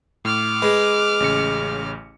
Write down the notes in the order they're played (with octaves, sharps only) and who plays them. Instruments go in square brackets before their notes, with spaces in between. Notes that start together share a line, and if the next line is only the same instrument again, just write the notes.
[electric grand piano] A2 [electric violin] D6 F6
[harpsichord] G#3 [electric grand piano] B4
[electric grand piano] A1 C#3 C#7